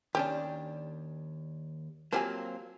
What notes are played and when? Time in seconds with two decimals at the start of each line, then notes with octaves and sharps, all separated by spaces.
0.15 D#2 C#4 D4 G4
2.12 F3 F#3 A#3 C4 G4 G#5